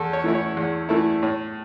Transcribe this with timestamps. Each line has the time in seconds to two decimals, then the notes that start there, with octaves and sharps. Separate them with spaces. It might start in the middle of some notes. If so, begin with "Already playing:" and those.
Already playing: E2 A4
0.13 C#5
0.24 E3 A3 E4
0.35 C#5
0.57 E2
0.89 E3 A3 E4
1.23 A2